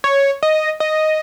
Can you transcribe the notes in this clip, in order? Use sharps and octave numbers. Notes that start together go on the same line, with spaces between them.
C#5
D#5
D#5